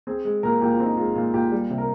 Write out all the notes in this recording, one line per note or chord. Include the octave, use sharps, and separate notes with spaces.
C4 G#4
G#3
A#2 A#4
A#2 G4
F4
C4
D#4
G#3 F4
A#2 F4
A#2 G4
G3
C3
A#4